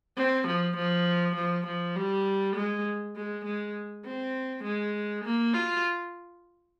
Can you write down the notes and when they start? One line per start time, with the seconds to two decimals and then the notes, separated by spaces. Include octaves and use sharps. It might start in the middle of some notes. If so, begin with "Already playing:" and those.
0.17 C4
0.48 F3
0.77 F3
1.36 F3
1.67 F3
1.96 G3
2.56 G#3
3.16 G#3
3.45 G#3
4.05 C4
4.64 G#3
5.24 A#3
5.54 F4